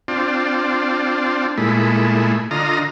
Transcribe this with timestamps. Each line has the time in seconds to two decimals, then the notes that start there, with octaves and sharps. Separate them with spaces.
0.08 C4 D4 F4
1.58 A#2 G#3 A3 E4
2.51 D3 F4 D#5 A#5